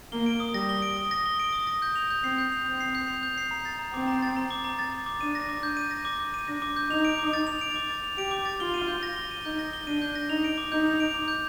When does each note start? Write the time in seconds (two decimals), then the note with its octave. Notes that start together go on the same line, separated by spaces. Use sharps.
0.12 A#3 G7
0.26 D7
0.40 D#6
0.54 G3 A#6
0.69 G7
0.82 D7
0.97 D#6
1.11 A#6
1.26 G7
1.40 D7
1.53 D#6
1.67 A#6
1.82 G6
1.96 F7
2.10 G6
2.24 C4 C7
2.38 G6
2.52 F7
2.66 C4 G6
2.80 C7
2.95 G6
3.08 F7
3.23 G6
3.38 C7
3.51 A#5
3.65 A6
3.79 A#5
3.93 C4 D6
4.08 A#5
4.22 A6
4.37 A#5
4.51 D6
4.64 A#5
4.79 A6
4.93 A#5
5.06 D6
5.21 D4 D#7
5.35 A#6
5.49 D6
5.63 G6
5.77 D#7
5.91 A#6
6.05 D6
6.20 G6
6.34 D#7
6.48 D4 A#6
6.62 D6
6.76 G6
6.90 D#4 F7
7.05 D7
7.19 D6
7.33 A6
7.47 F7
7.61 D7
7.76 D6
7.90 A6
8.04 F7
8.18 G4 D7
8.31 D6
8.46 A6
8.60 F4 G7
8.74 D#7
8.88 G6
9.03 A#6
9.16 G7
9.31 D#7
9.45 D#4 G6
9.59 A#6
9.73 G7
9.87 D4 D#7
10.02 G6
10.15 A#6
10.29 D#4 F7
10.44 D7
10.58 D6
10.72 D#4 G6
10.86 F7
11.00 D7
11.14 D6
11.28 G6